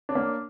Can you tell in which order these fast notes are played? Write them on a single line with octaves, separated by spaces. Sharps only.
D4 C#5 A#3